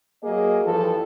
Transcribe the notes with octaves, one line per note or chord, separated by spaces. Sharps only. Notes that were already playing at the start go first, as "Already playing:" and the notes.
F#3 A#3 G#4 D#5
G2 E3 F3 A4